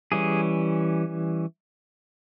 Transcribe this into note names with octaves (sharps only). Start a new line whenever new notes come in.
E3 G3 C#4 G#4